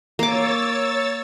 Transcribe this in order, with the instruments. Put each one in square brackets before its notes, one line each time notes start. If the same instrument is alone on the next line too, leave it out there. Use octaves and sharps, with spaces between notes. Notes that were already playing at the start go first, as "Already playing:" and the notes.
[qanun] A#3 D6 [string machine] C#5 E6 A6